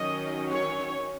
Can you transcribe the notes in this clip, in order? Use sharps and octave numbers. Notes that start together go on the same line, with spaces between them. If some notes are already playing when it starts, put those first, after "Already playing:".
Already playing: D#3 F#3 C#4 D#5
C#5